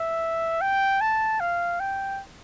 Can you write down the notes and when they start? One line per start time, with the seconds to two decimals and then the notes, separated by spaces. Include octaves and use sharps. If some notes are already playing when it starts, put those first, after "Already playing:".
Already playing: E5
0.61 G5
1.01 A5
1.40 F5
1.80 G5